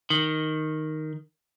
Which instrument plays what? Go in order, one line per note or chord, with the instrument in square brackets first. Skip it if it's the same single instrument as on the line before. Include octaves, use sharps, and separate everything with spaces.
[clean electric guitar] D#3